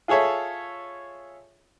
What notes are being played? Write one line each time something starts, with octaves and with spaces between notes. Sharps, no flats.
F4 G#4 A4 C#5 E5